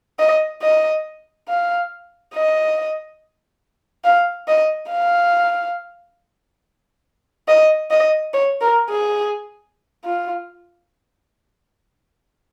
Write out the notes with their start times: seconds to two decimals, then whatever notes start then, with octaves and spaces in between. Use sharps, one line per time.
0.19 D#5
0.62 D#5
1.49 F5
2.34 D#5
4.05 F5
4.48 D#5
4.90 F5
7.48 D#5
7.91 D#5
8.33 C#5
8.61 A#4
8.90 G#4
10.05 F4